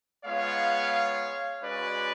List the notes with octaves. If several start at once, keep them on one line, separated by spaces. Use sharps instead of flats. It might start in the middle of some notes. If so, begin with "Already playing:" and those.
G#3 B3 F4 C#5 F5
G#3 C#4 F#4 B4 D5